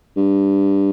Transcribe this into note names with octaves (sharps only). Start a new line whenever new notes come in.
G2